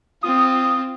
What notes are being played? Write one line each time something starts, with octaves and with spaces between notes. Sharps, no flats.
C4 F4 D#6